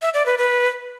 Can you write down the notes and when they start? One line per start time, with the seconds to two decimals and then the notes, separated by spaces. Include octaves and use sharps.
0.02 E5
0.14 D5
0.26 B4
0.38 B4